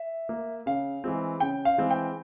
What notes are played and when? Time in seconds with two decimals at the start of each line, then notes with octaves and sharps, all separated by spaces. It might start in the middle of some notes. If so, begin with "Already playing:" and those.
Already playing: E5
0.29 A#3
0.66 C#3 F5
1.04 E3 G#3 C4
1.40 C#3 G5
1.65 F5
1.78 E3 G#3 C4
1.91 G5